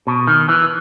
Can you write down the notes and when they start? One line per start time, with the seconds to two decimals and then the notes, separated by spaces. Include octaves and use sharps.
0.07 B2
0.27 D#3
0.49 E3